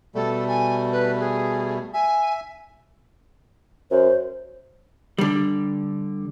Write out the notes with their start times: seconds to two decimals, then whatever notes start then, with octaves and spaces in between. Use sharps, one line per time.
0.15 B2 G3 A3 A4
0.48 G#5
0.92 B4
1.20 G#4
1.94 E5 G#5
3.91 F#2 C5
5.18 D3 G3